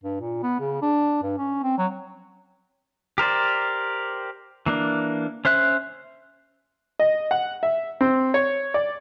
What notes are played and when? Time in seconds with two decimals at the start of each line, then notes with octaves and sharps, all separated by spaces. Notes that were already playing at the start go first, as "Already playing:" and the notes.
0.03 G2
0.20 A#2
0.43 B3
0.60 C#3
0.82 D4
1.23 G2
1.38 C#4
1.63 C4
1.78 F#3
3.18 G4 A#4 C5 D5
4.66 E3 A#3 D4
5.45 C#4 C5 E5 F#6
7.00 D#5
7.31 F#5
7.63 E5
8.01 C4
8.34 C#5
8.74 D5